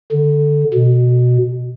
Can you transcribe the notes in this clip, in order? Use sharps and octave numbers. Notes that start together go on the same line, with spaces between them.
D3
B2